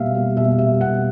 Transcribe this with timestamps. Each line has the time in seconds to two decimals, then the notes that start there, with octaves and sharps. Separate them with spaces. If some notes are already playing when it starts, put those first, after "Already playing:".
Already playing: B2 G3 A#3 E5 F5
0.15 G3 A#3
0.37 B2 E5
0.58 G3 A#3 E5
0.81 B2 F#5